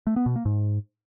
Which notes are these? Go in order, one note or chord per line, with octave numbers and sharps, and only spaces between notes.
A3
B3
B2
A#3
G#2